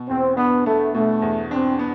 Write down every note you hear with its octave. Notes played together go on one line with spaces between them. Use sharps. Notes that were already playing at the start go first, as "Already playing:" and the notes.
Already playing: B2
E2 C4
B3 D4
A3 B3
B2 A3
E2
C4 D4
B3